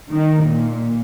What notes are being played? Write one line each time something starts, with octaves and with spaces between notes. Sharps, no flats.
D#3
A#2